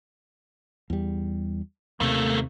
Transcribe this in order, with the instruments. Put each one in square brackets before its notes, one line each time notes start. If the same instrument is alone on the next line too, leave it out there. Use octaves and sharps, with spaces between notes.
[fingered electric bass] E2 G3
[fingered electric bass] D#2 C3 [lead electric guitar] A3 A#3